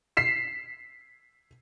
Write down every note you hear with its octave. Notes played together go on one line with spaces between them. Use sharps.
B6 C7 E7